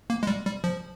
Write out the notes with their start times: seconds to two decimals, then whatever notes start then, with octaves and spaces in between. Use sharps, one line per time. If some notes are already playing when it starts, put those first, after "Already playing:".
0.10 A#3
0.23 G#3
0.27 G3
0.46 G3
0.64 F3